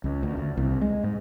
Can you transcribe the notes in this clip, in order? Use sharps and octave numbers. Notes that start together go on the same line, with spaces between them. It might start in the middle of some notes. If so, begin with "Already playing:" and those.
C#2
D2
D2
C2
G#3
G#2